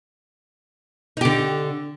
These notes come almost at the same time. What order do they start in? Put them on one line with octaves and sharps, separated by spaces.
D#4 G4 D3